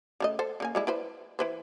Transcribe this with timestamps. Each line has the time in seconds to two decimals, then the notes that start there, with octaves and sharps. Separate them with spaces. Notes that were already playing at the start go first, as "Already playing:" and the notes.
0.20 C#3 A3 D#5
0.39 A4 C5
0.60 C#3 A#3 G#5
0.75 G3 G#3 E4
0.87 E4 B4 C5
1.39 E3 B4 C5